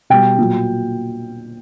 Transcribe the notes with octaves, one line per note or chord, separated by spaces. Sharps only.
B2 G3 G5
A#2 F#3